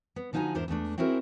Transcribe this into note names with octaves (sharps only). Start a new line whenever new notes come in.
B3
D3 F3 D#4 F#4 G#5 A#5
E2 G#2 D4 E4 A#4 C5
E2 G#3 A3 D4
C4 E4 F#4 G#4 A#4 C5